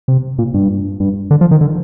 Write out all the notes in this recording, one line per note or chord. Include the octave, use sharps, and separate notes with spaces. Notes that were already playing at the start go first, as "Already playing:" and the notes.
C3
A#2
G2
G2
D3
F3
D#3
D3